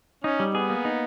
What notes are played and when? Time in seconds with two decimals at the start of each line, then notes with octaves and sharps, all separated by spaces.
0.24 C#4 D#4
0.40 G3
0.54 B3 G#4
0.70 A#3
0.85 D#4